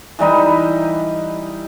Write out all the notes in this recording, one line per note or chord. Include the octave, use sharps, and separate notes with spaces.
E3 G3 D#4 B4